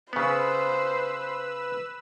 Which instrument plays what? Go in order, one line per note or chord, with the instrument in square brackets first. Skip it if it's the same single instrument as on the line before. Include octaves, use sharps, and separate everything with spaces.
[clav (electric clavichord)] C#3 B3 [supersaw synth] B4 E6 [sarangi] C5